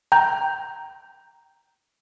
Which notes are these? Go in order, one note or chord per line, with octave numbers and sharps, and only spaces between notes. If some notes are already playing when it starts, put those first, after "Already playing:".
G5 A#5 G6